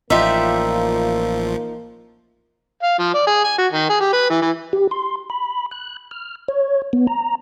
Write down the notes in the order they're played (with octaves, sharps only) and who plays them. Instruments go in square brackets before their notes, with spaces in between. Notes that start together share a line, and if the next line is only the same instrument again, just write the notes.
[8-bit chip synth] A1 F3 [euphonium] A#3 [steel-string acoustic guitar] D#4 F4 [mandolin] G4 D5 E5
[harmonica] F5
F3
D5
G#4
G#5
F#4
D#3
G#4
G4
B4
E3
E3
[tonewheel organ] G4
C6
B5
F#6
F6
C#5
B3
A#5